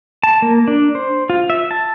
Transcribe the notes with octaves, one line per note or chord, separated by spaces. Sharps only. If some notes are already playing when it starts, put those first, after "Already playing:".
A5
A#3
D4
C5
F4
E5
A5